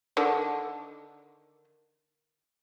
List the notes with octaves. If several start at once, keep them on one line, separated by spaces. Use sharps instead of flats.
D3 D#3 D4